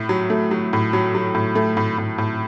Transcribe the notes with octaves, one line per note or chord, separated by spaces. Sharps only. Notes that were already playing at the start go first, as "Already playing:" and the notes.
Already playing: A2
F#3
A3
F#3
A2
F#3
F#3
A2
A3
A2
A2
A2